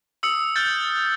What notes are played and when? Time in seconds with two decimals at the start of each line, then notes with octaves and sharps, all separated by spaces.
0.23 D#6 E6 C#7
0.56 F6 G6 A6